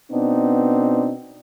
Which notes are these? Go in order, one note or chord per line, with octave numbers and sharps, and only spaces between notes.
B2 B3 C4 D4 D#4